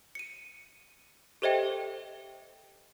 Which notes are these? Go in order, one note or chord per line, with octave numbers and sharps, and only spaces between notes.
C#7 D#7
G4 A4 C5 D#5 E5 G5